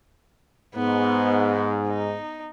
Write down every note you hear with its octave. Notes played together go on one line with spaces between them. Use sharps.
G#2 B3
D#4